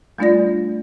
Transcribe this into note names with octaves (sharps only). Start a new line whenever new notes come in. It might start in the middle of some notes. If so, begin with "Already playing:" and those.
G3 A3 D4 F4 D5 A#6